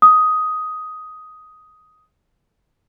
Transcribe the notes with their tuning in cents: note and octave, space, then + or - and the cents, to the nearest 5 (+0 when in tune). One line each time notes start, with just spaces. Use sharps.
D#6 +10